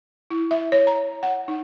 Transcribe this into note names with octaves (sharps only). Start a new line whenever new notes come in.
E4
E5
C#5
A#5
F#5
D#4